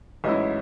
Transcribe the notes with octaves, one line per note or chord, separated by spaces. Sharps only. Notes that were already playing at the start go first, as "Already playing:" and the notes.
A1 G#2 F#3 C#4 E4 D#5